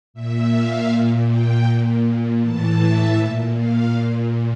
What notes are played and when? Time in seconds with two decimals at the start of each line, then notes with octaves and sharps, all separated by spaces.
0.14 A#2 E5
0.51 F5
0.89 A#2
1.27 G5
1.65 A#2
2.41 A2 E3 A5
2.79 E5
3.18 A#2
3.55 F5
3.93 A#2